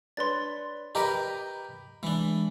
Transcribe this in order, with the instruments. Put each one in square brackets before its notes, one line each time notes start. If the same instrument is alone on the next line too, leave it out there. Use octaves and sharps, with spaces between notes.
[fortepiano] D4 B4 C#5 [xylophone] C6 A6
[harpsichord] G4 A#4 B4 [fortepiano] D#5 A#5 D6
[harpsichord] E3 D4 [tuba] G#3